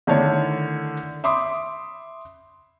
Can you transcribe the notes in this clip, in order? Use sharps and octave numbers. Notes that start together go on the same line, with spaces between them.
D3 D#3 A3 D4 E4 C#5
E5 B5 C6 D6 D#6